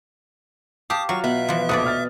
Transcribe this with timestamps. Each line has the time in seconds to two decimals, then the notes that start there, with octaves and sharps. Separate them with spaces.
0.90 G4 F5 A5 D6 D#6
1.09 F#3 F4 F#4 F5 C#6
1.24 B2 B3 E5
1.48 E3 F3
1.69 F1 A#1 F#4 B4 D5 D#6
1.86 F6 A6